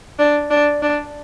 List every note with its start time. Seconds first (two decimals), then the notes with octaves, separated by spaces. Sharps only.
0.19 D4
0.50 D4
0.82 D4